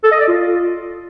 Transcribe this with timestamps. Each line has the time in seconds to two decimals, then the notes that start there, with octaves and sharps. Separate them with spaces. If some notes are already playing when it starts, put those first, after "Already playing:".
0.04 A4
0.12 D#5
0.20 D5
0.28 F4